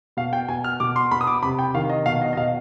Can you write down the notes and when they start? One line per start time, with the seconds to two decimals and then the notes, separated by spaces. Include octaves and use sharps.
0.17 B2 F5
0.33 G5
0.48 B2 G#5
0.64 F6
0.80 B2 D6
0.96 C6
1.11 B2 B5
1.21 D#6
1.27 D6
1.43 C3 B5
1.59 G5
1.74 D#3 F5
1.90 D#5
2.06 B2 F5
2.21 D#5
2.33 D#5
2.37 B2 F5